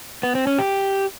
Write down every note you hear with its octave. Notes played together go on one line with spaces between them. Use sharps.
B3
C4
C#4
G4